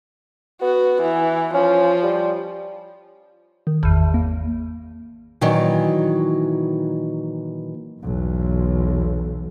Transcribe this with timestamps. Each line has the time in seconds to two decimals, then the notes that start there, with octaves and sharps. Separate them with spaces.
0.61 B3 F#4
1.02 E3
1.54 F3 C#4
2.03 G3
3.67 D#3
3.83 G#1 E2
4.14 A#3
5.41 A#2 D#3 E3 F#3
8.01 B1 E2